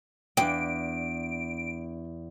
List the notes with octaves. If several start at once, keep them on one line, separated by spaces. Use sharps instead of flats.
E2 D4 F5 G5 D7